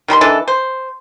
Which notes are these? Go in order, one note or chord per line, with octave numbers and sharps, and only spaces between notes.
D#3 G3 B5 C6
D#3 E3 D4 A4
C5